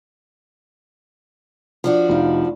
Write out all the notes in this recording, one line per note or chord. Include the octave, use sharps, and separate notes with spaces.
F3 D4 F#4
F1 D#4 F5